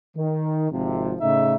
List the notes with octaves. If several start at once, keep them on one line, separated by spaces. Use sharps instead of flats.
D#3
G#1 C3 F3
A2 C#3 D#4 E5